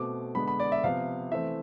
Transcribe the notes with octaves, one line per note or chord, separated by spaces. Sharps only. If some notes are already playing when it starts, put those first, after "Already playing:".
Already playing: B2 A3 C4 D6
D3 G#3 B3 B5
B5
D5
E5
C3 F3 B3 F5
E3 A3 C4 E5